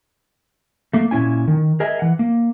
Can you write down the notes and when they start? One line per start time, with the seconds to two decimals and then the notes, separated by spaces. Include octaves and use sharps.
0.94 A3 A#3
1.11 A#2 C#4 E4 G#5
1.48 D#3
1.80 G#4 A#4 D#5 E5 G#5
1.99 E3 F#5
2.19 A#3